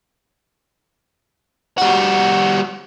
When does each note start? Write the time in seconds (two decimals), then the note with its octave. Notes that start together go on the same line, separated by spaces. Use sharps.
1.78 G3 F#4